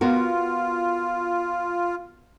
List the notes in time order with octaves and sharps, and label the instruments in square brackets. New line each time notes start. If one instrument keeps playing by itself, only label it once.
[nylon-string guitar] B3 F#4 A#4 [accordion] F4